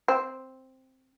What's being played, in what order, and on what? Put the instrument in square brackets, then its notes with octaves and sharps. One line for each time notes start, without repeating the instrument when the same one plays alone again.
[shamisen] C4